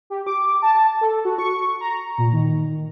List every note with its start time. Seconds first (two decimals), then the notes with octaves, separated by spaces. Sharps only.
0.10 G4
0.27 D6
0.62 A5
1.01 A4
1.25 F#4
1.38 C#6
1.81 A#5
2.18 A#2
2.33 D#3